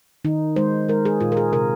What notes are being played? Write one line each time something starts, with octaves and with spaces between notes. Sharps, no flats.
D#3 D#4
G#3 C5
G#3 A#4
G#4
A#2 F4
A#4
G#4
C3 A#4